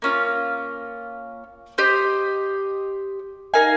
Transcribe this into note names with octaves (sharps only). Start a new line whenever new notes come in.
A#3 C#4 F4
G4 C5 D#5
D#4 A#4 F5 G#5